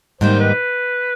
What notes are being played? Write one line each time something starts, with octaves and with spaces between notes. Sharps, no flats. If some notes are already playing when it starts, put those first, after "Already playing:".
G#2 D#3 G3 A#3 D#4 C5
B4